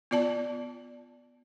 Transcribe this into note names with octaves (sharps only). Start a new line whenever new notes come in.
B3 F4 D5 A5